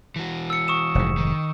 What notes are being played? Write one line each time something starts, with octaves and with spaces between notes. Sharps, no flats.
E3 F#4
E6 C#7
C#6 D#6 E7
F1 G#2
D#3